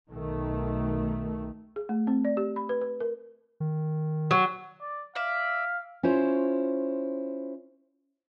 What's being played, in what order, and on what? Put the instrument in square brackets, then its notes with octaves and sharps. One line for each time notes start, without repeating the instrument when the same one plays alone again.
[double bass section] B1 D#3 A3
[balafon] G#4
A3
C4
D5
G4
B5
B4
B4
A#4
[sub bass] D#3
[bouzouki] F#3
[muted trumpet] D5
[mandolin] D5 E5 [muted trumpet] F5
[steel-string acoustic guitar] C#4 E4 F4 C5 C#5